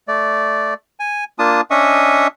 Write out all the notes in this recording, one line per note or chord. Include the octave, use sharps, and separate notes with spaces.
A3 D5
G#5
A#3 D4 F4 A5 D#6
C#4 D4 D#5 E5 C#6 D#6